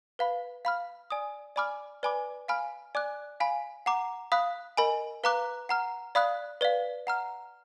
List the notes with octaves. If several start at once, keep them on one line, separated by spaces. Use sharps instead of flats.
B4 F5 B5
F5 B5 F6
D5 G#5 D#6
D5 G#5 B5 D6 F6
B4 D5 G#5 B5 D6
F5 G#5 B5 F6
D5 G#5 D6 F#6
F5 G#5 B5
F#5 A#5 D6
F5 B5 D#6 F#6
A#4 D#5 G#5 B5
B4 F5 A#5 D6 F#6
F#5 A#5 F6
D5 F5 B5 D#6 F#6
B4 D5 F5
F#5 A#5 F6